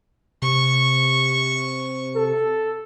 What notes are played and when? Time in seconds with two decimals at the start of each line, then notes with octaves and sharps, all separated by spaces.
0.42 C3 C#6
2.16 A4